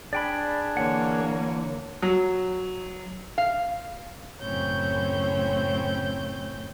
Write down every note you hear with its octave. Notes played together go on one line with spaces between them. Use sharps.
D4 G#4 D5 G5 B5
D3 E3 A#3 C#5 F#5
F#3
F5
F#2 A2 C#3 C4 C#5 G6